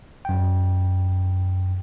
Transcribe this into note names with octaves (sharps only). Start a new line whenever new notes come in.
F#2 G5